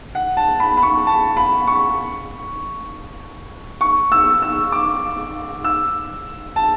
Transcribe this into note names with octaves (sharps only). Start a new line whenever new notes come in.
F#5
A5
B5
B5
C#6
A5
B5
C#6
C#6
E6
E6
D6
E6
A5